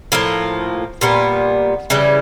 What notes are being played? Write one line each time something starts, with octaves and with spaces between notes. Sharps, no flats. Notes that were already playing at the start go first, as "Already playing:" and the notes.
A2 F3 A#3
A#2 G3 B3
C#3 E3 G3